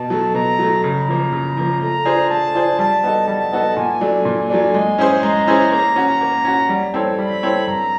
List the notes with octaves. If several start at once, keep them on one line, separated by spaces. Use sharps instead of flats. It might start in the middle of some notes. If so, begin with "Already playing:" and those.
Already playing: B2 A5
F#3 A3
B2 A#5
F#3 A3
C#3 A#5
F3 A#3
C#3
F3 A#3
A3 A#5
D4 F4 G#4 C5
A3 A5
D4 F4 G#4 C5
G3 A5
B3 D#4 F#4 A4
G3 A5
B3 D#4 F#4 A4
A#2 G#5
F#3 A3 D4
A#2 G#5
F#3 A3 D4
G#3
C#4 E4 G#4 C5
G#3 A#5
C#4 E4 G#4 C5
A#3 A#5
C#4 F#4
A#3
C#4 F#4
G3
C4 E4 A4 C#5
G3 B5
C4 E4 A4 C#5
G2 A#5